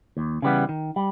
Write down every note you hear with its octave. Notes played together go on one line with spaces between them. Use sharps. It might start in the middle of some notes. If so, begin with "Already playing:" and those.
D#2
C#3 E3 G3 B3
D#3
G3